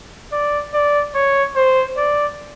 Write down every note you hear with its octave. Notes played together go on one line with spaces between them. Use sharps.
D5
D5
C#5
C5
D5